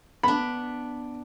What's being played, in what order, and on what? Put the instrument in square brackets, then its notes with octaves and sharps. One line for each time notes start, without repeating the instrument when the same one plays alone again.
[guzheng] B3 D4 [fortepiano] B5